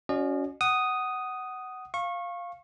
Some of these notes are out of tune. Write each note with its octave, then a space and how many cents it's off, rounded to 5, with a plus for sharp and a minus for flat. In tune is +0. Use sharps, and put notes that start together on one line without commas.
C#4 +20 F#4 -5 D#5 -40
F#5 +15 D#6 +0
F5 +0 C#6 -25